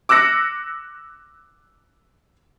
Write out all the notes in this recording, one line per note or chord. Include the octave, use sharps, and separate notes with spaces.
D6 E6 F#6 A#6 C#7